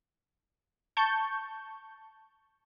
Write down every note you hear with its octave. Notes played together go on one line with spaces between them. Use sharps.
A5 C#6 G6